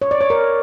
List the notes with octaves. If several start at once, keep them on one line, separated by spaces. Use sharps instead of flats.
C#5
D5
C#5
A#4